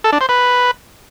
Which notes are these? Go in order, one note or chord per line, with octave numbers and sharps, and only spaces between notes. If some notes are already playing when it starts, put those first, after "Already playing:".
A4
D4
C5
B4